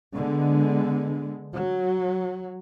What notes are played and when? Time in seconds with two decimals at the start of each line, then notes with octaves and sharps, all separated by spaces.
0.14 D3 G#3 B3
1.54 F#3